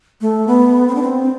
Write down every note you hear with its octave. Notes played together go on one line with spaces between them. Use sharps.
A3
B3
C4
D4
C4